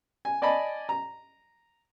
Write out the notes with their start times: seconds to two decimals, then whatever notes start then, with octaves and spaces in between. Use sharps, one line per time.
0.25 G#5
0.42 D5 D#5 G#5 A5 B5
0.89 A#5